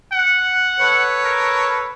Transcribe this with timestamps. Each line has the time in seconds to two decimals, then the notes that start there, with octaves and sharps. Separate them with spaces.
0.12 F#5
0.79 A4 B4 C#5
1.25 A#4